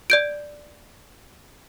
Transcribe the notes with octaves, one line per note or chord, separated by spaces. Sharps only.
D5 G6 D7